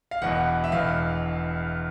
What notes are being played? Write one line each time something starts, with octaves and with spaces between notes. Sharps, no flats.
F5
E1 E2 B2 F#5
E5
E1 E2 B2 F5